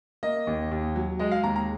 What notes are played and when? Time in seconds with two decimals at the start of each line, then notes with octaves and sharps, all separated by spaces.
0.23 A#3 D#5
0.47 D#2
0.71 D#2
0.96 F#3
1.19 G#3 D#5
1.32 F5
1.44 D#2 A#5
1.56 A#5